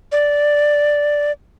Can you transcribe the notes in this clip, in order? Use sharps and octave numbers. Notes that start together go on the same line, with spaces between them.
D5